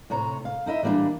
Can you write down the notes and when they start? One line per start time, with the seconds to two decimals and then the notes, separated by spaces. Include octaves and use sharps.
0.10 A2 C3 C#5 A#5
0.45 F5
0.66 D#4 E4 D#5 E5
0.83 E3 G3 A#3 C#4 D4